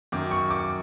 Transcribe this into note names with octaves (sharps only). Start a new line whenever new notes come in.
F#2 D#3 D6
C#6
D6